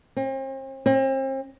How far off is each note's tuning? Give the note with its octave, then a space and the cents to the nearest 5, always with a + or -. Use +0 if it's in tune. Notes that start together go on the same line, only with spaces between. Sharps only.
C4 +40
C4 +40